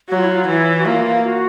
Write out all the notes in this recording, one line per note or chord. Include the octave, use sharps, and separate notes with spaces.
F#3 F#4
F4
E4
F4
E3 E4
F#4
A#3 F4
F#4